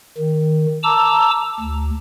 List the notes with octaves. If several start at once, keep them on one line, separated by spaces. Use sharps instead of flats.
D#3
A5 A#5 D6 E6
D2